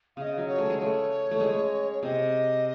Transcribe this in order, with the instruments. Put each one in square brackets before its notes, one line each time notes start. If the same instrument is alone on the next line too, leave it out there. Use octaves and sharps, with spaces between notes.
[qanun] C#3 [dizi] D#5 F5
[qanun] F#3
[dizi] C#5
[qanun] A3
G#3
[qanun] A3 [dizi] C#5
[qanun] A3
G#3
[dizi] C#5
[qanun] C3 [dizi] D#5